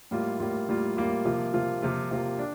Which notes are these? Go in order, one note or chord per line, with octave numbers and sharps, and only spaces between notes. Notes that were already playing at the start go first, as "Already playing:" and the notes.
A2 G3 A#3 F4
A2 G3 A#3 F4
A2 G3 A#3 F4
A2 G3 A#3 F4
C3 F3 A#3 F4
C3 F3 A#3 F4
C3 F3 A#3 F4
C3 F3 A#3 F4
D4